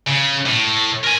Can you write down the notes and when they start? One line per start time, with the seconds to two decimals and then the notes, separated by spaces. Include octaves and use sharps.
0.07 C#3
0.46 A2
1.04 A#4 G#5